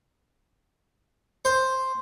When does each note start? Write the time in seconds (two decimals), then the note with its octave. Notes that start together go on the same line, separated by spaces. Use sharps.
1.45 C5